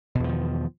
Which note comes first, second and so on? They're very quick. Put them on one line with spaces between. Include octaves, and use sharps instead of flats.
B2 E2 F3 D#3